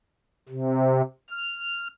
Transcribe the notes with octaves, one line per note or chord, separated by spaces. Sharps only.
C3
F6